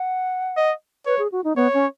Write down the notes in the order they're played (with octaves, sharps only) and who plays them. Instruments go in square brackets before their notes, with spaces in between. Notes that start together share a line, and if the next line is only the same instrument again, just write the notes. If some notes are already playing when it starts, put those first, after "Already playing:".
Already playing: [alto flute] F#5
[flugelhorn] D#5
[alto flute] B4 [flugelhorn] C#5
[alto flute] G#4
F#4
D#4
[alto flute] B3 [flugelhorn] C#5
[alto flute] C#4